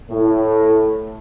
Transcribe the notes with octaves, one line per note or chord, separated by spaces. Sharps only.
A2